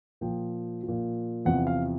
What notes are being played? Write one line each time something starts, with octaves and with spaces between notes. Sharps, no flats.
A#2 F3 G5
A#2 F3
E2 C3 F3 F#5
F5